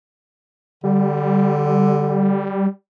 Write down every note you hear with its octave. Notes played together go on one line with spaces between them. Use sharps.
D3 G3